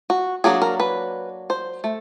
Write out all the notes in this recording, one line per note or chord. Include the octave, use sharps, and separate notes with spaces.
F#4
F#3 A#3 D4 G#4
A#4
B4
C5
A3